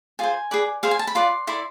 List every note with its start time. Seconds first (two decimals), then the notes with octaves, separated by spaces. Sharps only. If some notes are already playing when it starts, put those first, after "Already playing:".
0.19 F4 G#4 C5 G#5
0.51 G#4 B4 D5
0.83 G#4 C5 F5
0.91 G#5
0.99 A5
1.07 B5
1.15 F4 B4 D5 C6
1.47 E4 A4 D5 C6